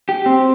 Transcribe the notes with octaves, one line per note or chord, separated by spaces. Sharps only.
G4
C4